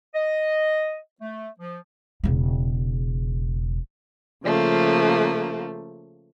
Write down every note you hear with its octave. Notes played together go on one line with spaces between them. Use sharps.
D#5
A3
F3
E1 C#3
C#3 F3 A3 A#3